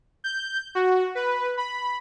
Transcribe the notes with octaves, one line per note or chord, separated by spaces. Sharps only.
G6
F#4
B4
B5